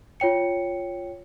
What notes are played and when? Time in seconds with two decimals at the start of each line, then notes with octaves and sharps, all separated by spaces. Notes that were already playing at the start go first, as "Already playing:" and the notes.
0.20 F4 C#5 G5 C#7